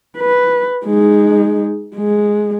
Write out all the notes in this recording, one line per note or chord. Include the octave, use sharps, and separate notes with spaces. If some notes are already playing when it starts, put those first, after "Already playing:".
B4
G#3 D#4
G#3